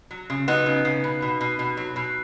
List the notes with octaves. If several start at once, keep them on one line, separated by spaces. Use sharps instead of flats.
F#3
C#3
F#3 B3 D#4
C#3
C#3
B2
B2
B2
B2
F#3
B2